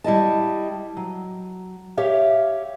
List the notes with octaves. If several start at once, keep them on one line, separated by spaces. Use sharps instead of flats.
G3 E4 D#5 A5
F#3
G4 C#5 E5 F5